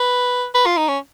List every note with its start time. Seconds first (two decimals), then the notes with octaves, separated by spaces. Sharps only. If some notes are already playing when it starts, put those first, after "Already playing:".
Already playing: B4
0.55 B4
0.66 F4
0.77 D#4
0.88 C#4